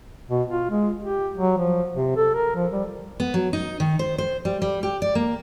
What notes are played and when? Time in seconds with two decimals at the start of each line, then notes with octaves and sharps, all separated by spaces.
0.29 B2
0.49 F4
0.70 G#3
1.01 G4
1.36 F#3
1.58 F3
1.94 C3
2.16 A4
2.34 A#4
2.55 F3
2.72 G3
3.20 B3
3.34 F#3
3.53 D#4
3.80 D#3
3.99 C5
4.18 C5
4.45 G3
4.62 G3
4.83 G4
5.02 D5
5.15 A#3